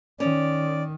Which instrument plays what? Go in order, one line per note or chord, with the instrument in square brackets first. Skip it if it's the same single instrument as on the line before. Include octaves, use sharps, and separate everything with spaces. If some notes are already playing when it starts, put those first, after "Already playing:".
[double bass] D#3 [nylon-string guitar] C#4 [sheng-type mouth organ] D5